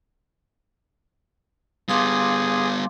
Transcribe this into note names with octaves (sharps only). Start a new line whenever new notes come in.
G3 B3 G#4 F5 C6 D6